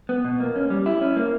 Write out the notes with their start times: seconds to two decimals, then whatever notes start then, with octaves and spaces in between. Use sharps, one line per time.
0.09 B3
0.25 B2
0.40 A#3
0.56 C#4
0.70 G3
0.86 E4
1.01 C#4
1.17 A#3